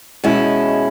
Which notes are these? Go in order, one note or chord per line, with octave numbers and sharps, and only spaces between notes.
B2 G#3 C#4 E4